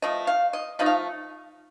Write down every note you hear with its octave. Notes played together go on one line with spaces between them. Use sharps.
F3 A3 D#5
F5
D#5
F3 A3 D#4 D#5
F5